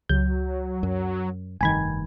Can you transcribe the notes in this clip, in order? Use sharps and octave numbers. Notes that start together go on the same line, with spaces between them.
C#2 F#3 G6
F#2
F1 G2 D#3 G#5 B5 G#6